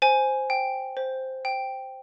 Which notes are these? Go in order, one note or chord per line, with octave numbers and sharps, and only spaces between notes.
C5 G#5
G5
C5
G5